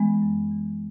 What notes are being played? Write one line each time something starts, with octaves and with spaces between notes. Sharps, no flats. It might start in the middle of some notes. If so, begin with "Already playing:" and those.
Already playing: E3 G#3 B3
F#2
E3